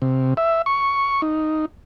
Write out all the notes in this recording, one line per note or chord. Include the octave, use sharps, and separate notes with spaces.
C3
E5
C#6
D#4